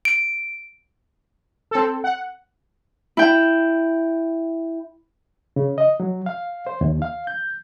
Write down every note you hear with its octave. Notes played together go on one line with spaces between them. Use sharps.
D7
C4 A4
F#5
E4 G5
C#3
D#5
F#3
F5
C5
D#2
F5
G6